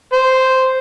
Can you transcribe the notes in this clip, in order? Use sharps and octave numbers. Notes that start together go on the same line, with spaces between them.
C5